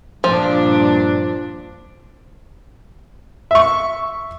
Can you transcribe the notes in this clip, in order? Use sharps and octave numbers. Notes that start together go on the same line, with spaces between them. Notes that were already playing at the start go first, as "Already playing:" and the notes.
G2 A#2 F3 D4
E5 C#6